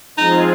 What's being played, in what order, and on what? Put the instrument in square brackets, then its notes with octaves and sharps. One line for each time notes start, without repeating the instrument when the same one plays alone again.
[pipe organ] F3 G#3 C4 F4 G#4 [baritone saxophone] D#4